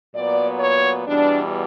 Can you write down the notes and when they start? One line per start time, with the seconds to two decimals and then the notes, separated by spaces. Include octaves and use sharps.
0.14 A#2 F#3 B3 D5
0.60 C#5
1.07 E2 B2 G3 D4